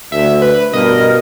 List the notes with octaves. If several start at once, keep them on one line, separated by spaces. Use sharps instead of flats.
D2 E5
B4
A1 G2 B2 A#4 D#5